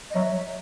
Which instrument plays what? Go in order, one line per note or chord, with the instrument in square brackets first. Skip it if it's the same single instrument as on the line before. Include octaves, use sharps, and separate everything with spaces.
[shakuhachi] D#5
[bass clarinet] F#3 [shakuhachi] E5